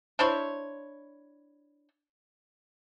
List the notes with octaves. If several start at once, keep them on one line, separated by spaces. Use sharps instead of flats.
D4 E4 C5 C#5